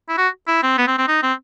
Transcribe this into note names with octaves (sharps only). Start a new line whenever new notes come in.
E4
F#4
E4
C4
B3
C4
C4
D#4
C4